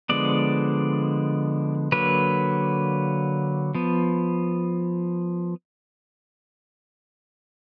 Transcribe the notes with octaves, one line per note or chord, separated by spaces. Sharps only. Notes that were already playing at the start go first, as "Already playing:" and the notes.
D3 F3 G#3 B3 D5
D3 F#3 A#3 B4
F3 B3